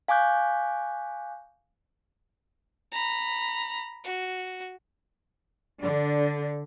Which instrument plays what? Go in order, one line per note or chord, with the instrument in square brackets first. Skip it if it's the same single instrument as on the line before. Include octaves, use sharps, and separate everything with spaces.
[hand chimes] F5 G#5 C#6 D6 F#6 G6
[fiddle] A#5 B5
F#4
[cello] D3 D4